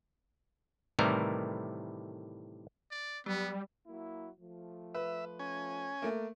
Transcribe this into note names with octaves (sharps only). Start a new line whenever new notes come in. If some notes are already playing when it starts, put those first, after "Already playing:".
A2 C3 D#3 E3 G3 A#4
D5
F#3 G3 B3
F#3 A#3 E4
F3 A3
B4 E5
C#4 G#5
A3 A#3